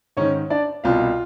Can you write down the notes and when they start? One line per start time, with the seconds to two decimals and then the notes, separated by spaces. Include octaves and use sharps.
0.17 G#2 D#3 C#4 C#5
0.50 D4 D5
0.84 C2 B2 F4 F5